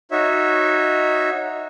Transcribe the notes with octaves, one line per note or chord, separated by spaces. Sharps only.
D#4 F#4 C#5 E5